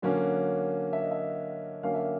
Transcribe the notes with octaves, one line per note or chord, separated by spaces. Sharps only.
D3 F#3 A#3 C#4
E5
D#5
E5
D3 F#3 A#3 C#4 F5
E5